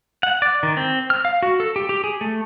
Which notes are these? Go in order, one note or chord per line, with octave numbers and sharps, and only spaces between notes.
F#5
D5
D#3
C4
F6
F5
F#4
A4
G4
G4
G#4
A3